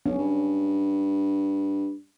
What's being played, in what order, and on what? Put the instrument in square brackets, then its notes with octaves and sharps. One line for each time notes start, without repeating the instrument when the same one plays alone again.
[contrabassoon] B1 [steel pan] C#4
[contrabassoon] G2